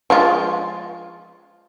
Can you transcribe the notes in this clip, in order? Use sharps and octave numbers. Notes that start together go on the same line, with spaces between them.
F3 G#3 F4